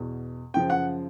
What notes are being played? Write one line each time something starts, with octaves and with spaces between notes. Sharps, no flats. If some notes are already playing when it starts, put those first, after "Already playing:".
Already playing: E2 B2
F#2 C#3 F3 G5
F#5